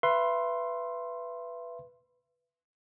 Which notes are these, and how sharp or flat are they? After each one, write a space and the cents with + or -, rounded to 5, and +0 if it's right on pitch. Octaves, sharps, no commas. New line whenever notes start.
B4 +0 E5 +35 C6 +10